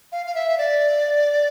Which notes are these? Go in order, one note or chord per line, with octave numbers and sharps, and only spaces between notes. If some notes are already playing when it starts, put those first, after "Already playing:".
F5
F5
E5
D5